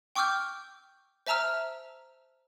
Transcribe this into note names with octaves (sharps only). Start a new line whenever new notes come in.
G5 C#6 D6 E6 F6 G6
C5 E5 A5 A#5 E6 F6